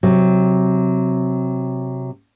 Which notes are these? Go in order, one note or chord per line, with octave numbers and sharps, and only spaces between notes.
C3 F#3